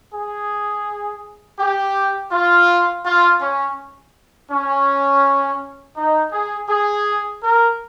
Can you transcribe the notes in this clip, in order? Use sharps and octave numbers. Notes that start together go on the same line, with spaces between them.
G#4
G4
F4
F4
C#4
C#4
D#4
G#4
G#4
A#4